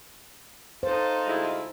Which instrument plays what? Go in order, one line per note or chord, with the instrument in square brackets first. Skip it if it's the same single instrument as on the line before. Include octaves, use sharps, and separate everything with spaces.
[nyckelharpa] D#4 A4 [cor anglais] F4 [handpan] C5
[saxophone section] D2 G#3 E4